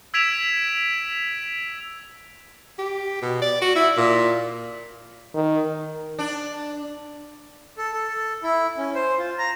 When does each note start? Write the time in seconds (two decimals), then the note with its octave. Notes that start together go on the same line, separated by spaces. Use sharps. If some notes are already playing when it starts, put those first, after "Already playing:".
0.14 E6 G#6 B6 D7 E7 F7
2.79 G4
3.22 B2
3.42 D5
3.61 F#4
3.76 E4
3.97 A#2
5.35 D#3
6.19 D4
7.78 A4
7.93 A4
8.43 E4
8.78 C#4
8.95 C5
9.18 F4
9.38 A#5